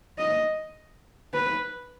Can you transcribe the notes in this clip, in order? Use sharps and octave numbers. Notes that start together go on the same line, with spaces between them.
D#5
B4